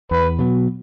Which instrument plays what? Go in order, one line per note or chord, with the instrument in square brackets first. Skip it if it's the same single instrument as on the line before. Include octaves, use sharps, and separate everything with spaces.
[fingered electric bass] E2 [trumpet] B4
[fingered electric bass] B2 F#3 B3